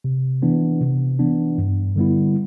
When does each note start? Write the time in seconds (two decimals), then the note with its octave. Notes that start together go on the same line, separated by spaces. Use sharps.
0.04 C3
0.42 E3 B3 D4
0.81 C3
1.19 E3 B3 D4
1.58 G2
1.96 D3 G3 B3 E4